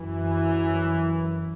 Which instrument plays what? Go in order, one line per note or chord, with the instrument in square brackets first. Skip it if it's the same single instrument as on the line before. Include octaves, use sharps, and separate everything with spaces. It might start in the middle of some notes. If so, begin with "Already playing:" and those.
Already playing: [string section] F#2 E3